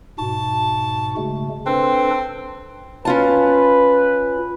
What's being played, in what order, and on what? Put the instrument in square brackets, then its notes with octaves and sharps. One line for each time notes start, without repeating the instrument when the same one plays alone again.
[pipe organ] G#2 B2 F#4 [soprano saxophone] A5
[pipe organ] C#3 G#3 A3
[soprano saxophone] C4 [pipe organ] D4 A4 B4
[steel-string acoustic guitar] C#4 F4 A5 [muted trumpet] B4